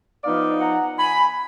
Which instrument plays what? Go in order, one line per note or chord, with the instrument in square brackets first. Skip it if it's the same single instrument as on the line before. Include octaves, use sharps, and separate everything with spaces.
[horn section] F3 B3 D#4 D5 F5
F#5 A#5
G#5 B5